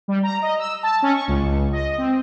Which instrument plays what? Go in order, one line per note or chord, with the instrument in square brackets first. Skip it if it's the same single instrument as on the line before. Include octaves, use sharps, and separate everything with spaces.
[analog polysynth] G3
A#5
D#5
E6
A5
C#4
C#6
C#2
D#5
C4